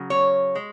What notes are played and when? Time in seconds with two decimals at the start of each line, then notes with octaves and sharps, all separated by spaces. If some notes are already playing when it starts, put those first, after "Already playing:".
Already playing: C#3 F#3
0.10 C#5
0.55 G#3